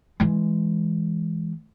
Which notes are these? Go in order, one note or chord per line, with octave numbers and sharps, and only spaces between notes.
E3 G#3